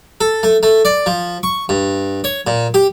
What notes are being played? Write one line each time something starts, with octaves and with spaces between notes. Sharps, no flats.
A4
A3
A3
D5
F3
C#6
G2
C#5
A#2
G4